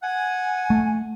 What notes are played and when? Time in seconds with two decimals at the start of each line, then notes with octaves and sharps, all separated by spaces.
0.02 F#5 G#5
0.70 A3